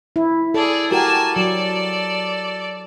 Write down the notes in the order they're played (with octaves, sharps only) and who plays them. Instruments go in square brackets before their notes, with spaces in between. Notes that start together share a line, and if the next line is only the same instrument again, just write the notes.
[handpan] E4
[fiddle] G#4 D5 [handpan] A4
[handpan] F#4 G4 A#4 [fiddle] G#5 A5
[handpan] F#3 [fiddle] A4 D5